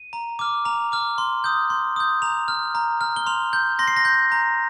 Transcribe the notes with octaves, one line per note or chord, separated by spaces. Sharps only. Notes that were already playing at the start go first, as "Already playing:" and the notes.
Already playing: D#7
A#5
D6 F6
A#5 F7
D6 F6
C6
D#6 G6
C6
D#6 G6
A#5 F7
F6
A#5
F6
G7
C6 F7
G6
C6 A#6
C7
A#6
G6
A#5